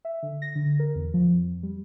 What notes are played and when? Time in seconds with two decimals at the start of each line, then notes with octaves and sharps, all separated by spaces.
0.05 E5
0.23 D3
0.42 A#6
0.55 D3
0.79 A#4
0.95 E2
1.14 F3
1.34 F2
1.63 G3